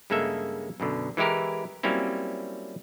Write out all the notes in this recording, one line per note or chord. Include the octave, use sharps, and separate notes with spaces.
G2 C#3 G#3 A#3 A4 E5
F#2 B2 D3
E3 G#3 E4 G4 A#4
F#3 G3 A#3 C4 C#4 E4